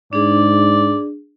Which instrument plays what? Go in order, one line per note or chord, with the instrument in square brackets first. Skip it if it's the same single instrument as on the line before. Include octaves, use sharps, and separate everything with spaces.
[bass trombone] G#2 [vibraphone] D4 G#4 [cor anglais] D5